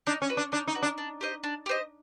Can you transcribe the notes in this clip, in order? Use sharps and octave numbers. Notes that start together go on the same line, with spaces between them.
D4 D#4
C#4
F#4 B4
D4
D4 D#4
D#4
F#4 B4
D4
D4
G4 C5 D#5
D4
G4 C5 D#5